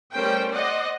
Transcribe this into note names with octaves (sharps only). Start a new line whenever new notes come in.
G3 A3 C#4 A#4 C5 G5
C5 D5 D#5 F#5